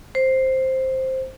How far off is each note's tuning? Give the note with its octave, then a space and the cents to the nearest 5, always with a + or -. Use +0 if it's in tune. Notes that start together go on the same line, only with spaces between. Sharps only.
C5 +5